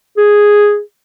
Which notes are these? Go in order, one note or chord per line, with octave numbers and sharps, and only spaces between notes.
G#4